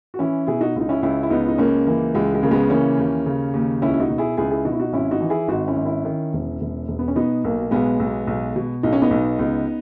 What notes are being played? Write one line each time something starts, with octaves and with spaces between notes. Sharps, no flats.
F#4
E3 C#4 E4
B2 E4 G#4
D#4 F#4
C#2
D#4
C#4 E4
C#2 C#4 E4
E4
C#2 B3 D#4
D#4
C#2 A#3 C#4
E3 A#3
C#2 G#3
G#3
C#3 A#3
G#3 B3
E3 A#3 C#4
D#2
C#3
D#2
C#2 C#4 E4
E4
D#4 F#4
B2
E4 G#4
C#2 E4 G#4
E4 G#4
B2 D#4 F#4
E4
D#4 F#4
G#1 C#4 E4
D#4 F#4
E3
E4 G#4
G#1 D#4 F#4
C#4 E4
G#1
C#4 E4
D#3
E1
E1
E1
B3
C#4
B2 B3 D#4
B1 A#3
B1 G#3 B3
B1
B1
B2
B1 D#4
C#4
B3 D#4
B1
C#2